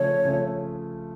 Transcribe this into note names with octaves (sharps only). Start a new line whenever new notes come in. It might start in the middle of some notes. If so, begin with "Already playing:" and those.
Already playing: C#3 F3 A3 C#5
C#3 F3 A3